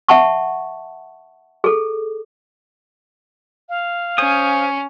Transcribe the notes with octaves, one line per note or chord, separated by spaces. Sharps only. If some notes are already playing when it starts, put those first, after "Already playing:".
E5 F#5 A5 C#6
G#4 A4
F5
C#4 C5 G#5 D#6